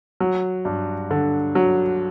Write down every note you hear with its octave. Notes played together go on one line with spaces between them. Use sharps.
F#3
G2
D3
F#3